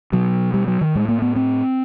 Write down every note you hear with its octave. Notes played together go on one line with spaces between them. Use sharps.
B2 F#3
G3
F#3
D#3
A2 G#3
A#3
B3
C4